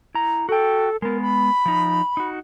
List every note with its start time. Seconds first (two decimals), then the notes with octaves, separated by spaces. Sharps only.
0.15 E4 A#5
0.49 F#4 A4 G5
1.02 G#3 B3 A#4
1.21 B5
1.66 F3 D#4
2.17 D#4 F#4